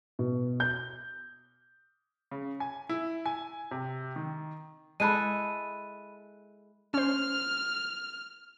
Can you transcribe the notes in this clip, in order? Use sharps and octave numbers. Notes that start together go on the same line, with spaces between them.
B2
G6
C#3
G#5
E4
G#5
C3
D#3
G#3 E4 A4 B5 F#6 D#7
C#4 C5 F6